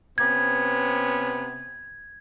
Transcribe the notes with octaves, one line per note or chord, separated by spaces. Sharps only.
C3 B3 C#4 G#6